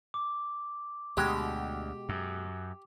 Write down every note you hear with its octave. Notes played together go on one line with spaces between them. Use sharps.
D6
D2 B2 G#3 G4
F#2